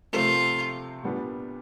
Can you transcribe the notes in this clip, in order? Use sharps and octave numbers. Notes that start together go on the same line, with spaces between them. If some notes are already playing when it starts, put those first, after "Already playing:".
C3 F3 A3 C4 F4
A#2 G3 B3 D4